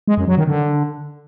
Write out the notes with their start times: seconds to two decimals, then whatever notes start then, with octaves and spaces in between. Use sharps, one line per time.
0.08 G#3
0.18 F#2
0.28 F#3
0.38 D#3
0.48 D3